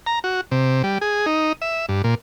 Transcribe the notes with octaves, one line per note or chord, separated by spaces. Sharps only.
A#5
F#4
C3
G3
G#4
D#4
E5
G2
A#2